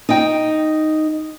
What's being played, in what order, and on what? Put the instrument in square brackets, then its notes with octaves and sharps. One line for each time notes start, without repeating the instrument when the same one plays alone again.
[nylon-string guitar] D#4 G5